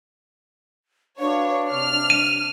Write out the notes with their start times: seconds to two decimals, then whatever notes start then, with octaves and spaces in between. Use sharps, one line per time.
1.20 D4 F#4 B4 C#5 F5
1.72 C3 F6
2.10 D#7